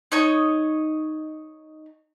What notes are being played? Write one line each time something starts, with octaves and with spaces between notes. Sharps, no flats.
D#4 C#5 D#5